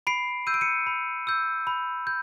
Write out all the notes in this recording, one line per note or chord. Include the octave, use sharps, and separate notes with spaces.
B5 C7 D7
E6 G6 D#7
D7
C#7 D#7
B5
E6 G6
B5
G6